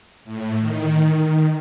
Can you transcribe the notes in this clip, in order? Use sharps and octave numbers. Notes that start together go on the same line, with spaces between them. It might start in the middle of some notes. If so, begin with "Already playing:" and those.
A2
D#3